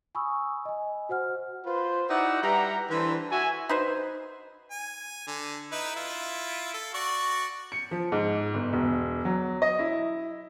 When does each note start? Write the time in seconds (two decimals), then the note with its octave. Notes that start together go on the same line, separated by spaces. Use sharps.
0.15 G#5 B5 C#6 D#6 E6
0.65 D#5 G#5
1.09 F#4 C5 F#5 F6
1.65 F4 B4 C5
2.09 D#4 E4 F#4 D5 E5 F#5
2.42 G3 B4 E5 F#5 A#5
2.90 E3 D4 A4 B4 C5
3.31 F#4 E5 G#5
3.69 D#4 B4 C5
4.71 G#5
5.27 D3
5.72 D#4 E4 B4
5.96 E4 F4
6.74 A4
6.94 F#4 D5 C#6
7.72 C#7
7.91 F3
8.12 G#2
8.54 G1
8.73 E1
9.25 F#3
9.62 D#5
9.79 E4